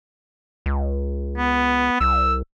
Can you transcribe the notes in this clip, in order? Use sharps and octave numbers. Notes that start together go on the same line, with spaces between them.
C#2
B3
C2 E6